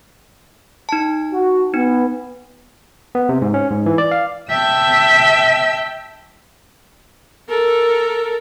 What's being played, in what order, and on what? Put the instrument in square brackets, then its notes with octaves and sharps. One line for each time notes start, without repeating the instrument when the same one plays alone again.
[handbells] D#4 A5
[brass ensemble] F#4
[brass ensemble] B3 [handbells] D#4
[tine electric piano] B3
C3
G#2
C#4
G#2
E3
D5
F5
[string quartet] E5 G5 A5 E6
[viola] A4 A#4